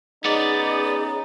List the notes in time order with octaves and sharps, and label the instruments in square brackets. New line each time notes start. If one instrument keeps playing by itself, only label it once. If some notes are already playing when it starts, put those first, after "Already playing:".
[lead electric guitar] B3 D5 [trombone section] C#4 D#4 [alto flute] G#4